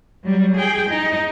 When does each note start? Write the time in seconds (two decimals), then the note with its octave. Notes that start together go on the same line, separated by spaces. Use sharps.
0.24 F#3 G3
0.57 G#4 G5
0.89 D#4